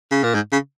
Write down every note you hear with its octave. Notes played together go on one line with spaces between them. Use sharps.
C#3
A#2
G#2
C#3